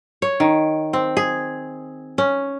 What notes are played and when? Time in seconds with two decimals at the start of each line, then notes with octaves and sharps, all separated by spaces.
0.22 C#5
0.40 D#3
0.93 C4
1.17 G#4
2.18 C#4